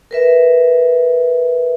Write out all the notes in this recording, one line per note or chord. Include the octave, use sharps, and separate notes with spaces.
A#4 B4 E5